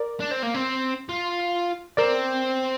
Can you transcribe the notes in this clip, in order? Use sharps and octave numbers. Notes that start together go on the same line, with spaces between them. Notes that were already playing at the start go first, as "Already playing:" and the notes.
Already playing: A#4 D5
D4
C4
A#3
C4
F4
C4 A#4 D5